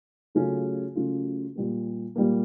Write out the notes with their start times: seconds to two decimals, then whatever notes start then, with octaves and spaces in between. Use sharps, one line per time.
0.35 C#3 F#3 A3 C#4 F4
0.95 C#3 F#3 A3 C#4 F4
1.55 A#2 G3 A#3
2.16 A#2 G3 A#3